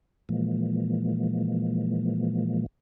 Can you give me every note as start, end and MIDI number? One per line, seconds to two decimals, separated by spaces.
0.29 2.66 46
0.29 2.66 52
0.29 2.66 53
0.29 2.66 56
0.29 2.66 58